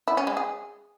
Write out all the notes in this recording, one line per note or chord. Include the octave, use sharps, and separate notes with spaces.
E4
C#4
G#3
G#4